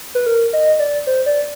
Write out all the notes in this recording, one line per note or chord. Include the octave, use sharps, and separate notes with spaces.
B4
A#4
D#5
D5
C5
D5